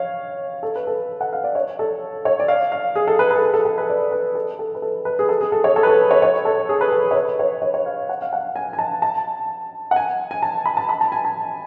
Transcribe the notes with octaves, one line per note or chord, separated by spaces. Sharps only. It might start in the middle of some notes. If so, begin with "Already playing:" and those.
Already playing: C#5 F5
A4
B4
A4
F#5
F5
D5
C#5
A4
C#5
D5
F5
F5
G#4
A4
B4
B4
A4
G#4
A4
A4
B4
D5
B4
A4
A4
B4
A4
B4
G#4
A4
G#4
A4
C#5
A4
B4
A4
C#5
C#5
A4
G#4
B4
A4
C#5
B4
C#5
C#5
C#5
F5
F#5
F5
F#5
G#5
G#5
A5
A5
F#5
G#5
G#5
A5
B5
A5
B5
A5
G#5
A5